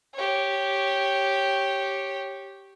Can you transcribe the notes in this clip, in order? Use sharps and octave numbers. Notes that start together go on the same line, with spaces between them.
G4 C#5